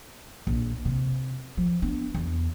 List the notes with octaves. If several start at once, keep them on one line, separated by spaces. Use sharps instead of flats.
A#1
C3
F3
B3 D4
E2